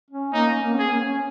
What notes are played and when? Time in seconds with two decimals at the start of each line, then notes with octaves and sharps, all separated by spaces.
0.11 C#4
0.33 A#3 D#4
0.47 C#4
0.61 A#3
0.75 C#4 G#4
0.88 A#3
1.02 C#4